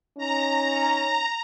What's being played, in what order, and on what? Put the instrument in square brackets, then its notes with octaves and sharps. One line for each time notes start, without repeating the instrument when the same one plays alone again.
[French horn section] C#4 D#4 [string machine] A#5